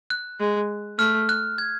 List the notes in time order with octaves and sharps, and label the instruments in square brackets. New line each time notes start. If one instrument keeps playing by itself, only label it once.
[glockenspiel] F#6
[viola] G#3
[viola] A3 [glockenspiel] F6
[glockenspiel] F#6
G#6